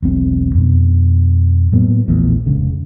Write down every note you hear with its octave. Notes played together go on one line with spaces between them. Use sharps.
E1 B1 C4
F2 B2
A2 F#3 A#3 B3
A#1 E2 A2
F1 C#2 C#3